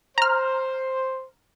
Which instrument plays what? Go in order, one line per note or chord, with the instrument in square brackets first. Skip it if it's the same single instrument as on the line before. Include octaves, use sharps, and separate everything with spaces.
[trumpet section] C5 [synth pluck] A#5 F6